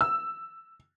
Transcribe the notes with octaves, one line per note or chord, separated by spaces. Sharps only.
E6